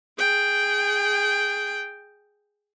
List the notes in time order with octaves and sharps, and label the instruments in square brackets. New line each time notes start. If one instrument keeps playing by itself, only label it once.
[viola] G#4 G5